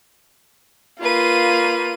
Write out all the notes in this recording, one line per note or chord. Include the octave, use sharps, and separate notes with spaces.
A#3 F4 B4 D#7